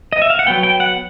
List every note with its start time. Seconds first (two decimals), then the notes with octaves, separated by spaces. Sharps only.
0.12 D#5
0.22 E5
0.30 F5
0.39 F#5
0.47 F#3 B3 G5
0.63 G5
0.80 F#5